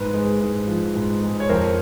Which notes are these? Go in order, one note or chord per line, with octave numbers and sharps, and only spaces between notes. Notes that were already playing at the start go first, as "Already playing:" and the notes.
Already playing: G#2 B4
G#3
G#2
F3
G#2
G#3
C#5
F2 A#4 C5